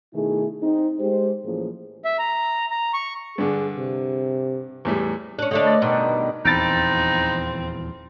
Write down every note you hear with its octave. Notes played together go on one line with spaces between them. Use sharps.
B2 D#3 A3 E4 G#4
C4 D#4
G#3 G4 C5
A2 E3 F3 A#3 C#4 G#4
E5
A#5
A#5
C#6
G2 D3 G#4
C3
E2 A2 G3
C#4 D4
D3 A3 D4 D#5
B4 D5
G2 B2 D3 D#3
D#1 E2 F3 C4 D#4 B5 A6 D7